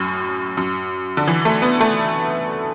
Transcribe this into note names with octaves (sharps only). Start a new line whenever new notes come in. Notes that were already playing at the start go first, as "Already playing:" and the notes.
Already playing: F#2 A2
F#2
D3
E3
A3
B3
A3